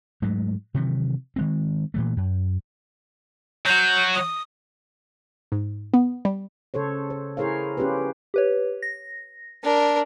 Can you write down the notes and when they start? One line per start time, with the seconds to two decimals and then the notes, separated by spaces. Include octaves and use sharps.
0.22 G#2 F#3 G#3 A3
0.74 C3 D#3 E3 F#3
1.36 D#3 G#3 C4
1.94 A#2 E3 A3
2.17 F#2
3.66 F#3 F#4 G6
4.15 D#6
5.52 G#2
5.94 B3
6.25 G3
6.74 C#3 A4 C5 C#5
7.10 C5
7.37 E4 G#4 A#4 C5 C#5 F5
7.77 C#4 F4 G4 G#4 B4 C5
8.34 G4 B4 C#5
8.82 A#6
9.63 D4 A#4